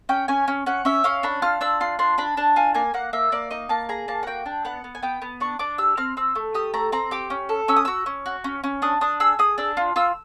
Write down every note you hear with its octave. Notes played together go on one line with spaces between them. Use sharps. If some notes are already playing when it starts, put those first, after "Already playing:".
C#4 G5
C#4 G#5
C#4
C#4 F#5
C#4 E5
C#4 F5
D4 B5
F4 F6
D4 E6
F4 C6
D4 C6
D4 B5
D4 A5
F4 G#5
A#3 G#5
A#3 F#5
A#3 E5
A#3 D5
D#4 D#5
A#3 A5
G#4 A#5
A#3 A5
F#5
F#4 G5
D4
B3 F#5
B3
G#5
B3 G5
B3
D4 C#6
D4 D6
G4 E6
C4 F6
C4 E6
A3
G4 D#6
A3 A#5
C4 A#5
G4 D6
C#4
A4
C#4 E6
D#6
F#4 E6
C#4
F#4
C#4
C#4
D4 D#6
D4 D#6
G#4 E6
G#4 D#6
D4 E6
F4
F4 E6